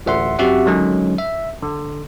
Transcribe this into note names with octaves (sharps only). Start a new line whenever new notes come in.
A1 D2 E5 F#5 C6
F#2 C4 F#4 G4 E5 F#5
D3 D#3 F#3 G#3 C#4
E5
D3